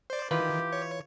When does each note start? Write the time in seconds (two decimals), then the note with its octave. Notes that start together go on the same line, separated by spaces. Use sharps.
0.10 C5 D5
0.31 D#3 E3 F4 G4 B4
0.73 C#5